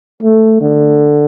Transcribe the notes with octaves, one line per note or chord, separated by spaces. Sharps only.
A3
D3